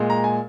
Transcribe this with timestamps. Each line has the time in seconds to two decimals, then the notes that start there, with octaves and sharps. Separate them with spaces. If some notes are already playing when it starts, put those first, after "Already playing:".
Already playing: A#2 G#3
0.10 A#5
0.24 G#5